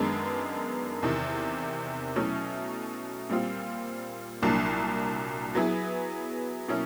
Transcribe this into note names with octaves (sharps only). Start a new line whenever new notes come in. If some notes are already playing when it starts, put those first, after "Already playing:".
Already playing: F#2 D#3 G#3 B3 D4
E2 C3 D#3
B2 F#3 A3 C#4 E4
A#2 G3 C4 F4
C2 A#2 F#3 A#3 D4
F#3 B3 E4 G#4
B2 F#3 A#3 C#4 E4